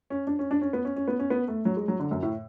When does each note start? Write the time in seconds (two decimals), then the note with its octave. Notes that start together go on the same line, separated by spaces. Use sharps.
0.10 C#4
0.27 D4
0.39 C#4
0.51 D4
0.61 C#4
0.73 B3
0.85 C#4
0.96 C#4
1.08 B3
1.19 C#4
1.30 B3
1.48 A3
1.65 F#3
1.77 G#3
1.88 F#3
2.00 D3
2.11 F#2
2.23 A2